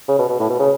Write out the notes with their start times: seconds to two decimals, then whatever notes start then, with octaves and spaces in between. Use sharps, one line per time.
0.08 C#3
0.19 B2
0.29 B2
0.40 A2
0.50 B2
0.60 C#3